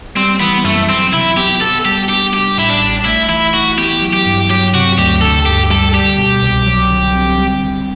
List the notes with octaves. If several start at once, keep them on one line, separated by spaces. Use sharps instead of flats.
G3 C4
E3 B3
F#2 A3
F#3 C4
C3 E4
B3 G4
B3 A4
G3 G4
D4 G4
G3 G4
A2 E4
D4
A1
A3 E4
E3 E4
E4 F#4
B3 G4
F#3
G4
G2
F#3 G4
C3 F#4
D2 G4
D3 A4
G2 G4
G3 A4
G3 G4
B2
C2
F#3
D3
C4
G3
D3